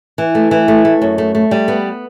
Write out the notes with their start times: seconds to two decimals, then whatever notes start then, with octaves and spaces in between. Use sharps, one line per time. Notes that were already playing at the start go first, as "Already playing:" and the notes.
0.18 E3
0.35 A3
0.51 E3
0.68 A3
0.85 A3
1.02 F#2
1.18 A3
1.35 A3
1.51 G3
1.68 B3